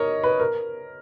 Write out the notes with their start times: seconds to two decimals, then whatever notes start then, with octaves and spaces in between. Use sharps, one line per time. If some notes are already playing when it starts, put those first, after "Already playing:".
Already playing: A#4 C#5 D#5
0.24 B4
0.40 A#4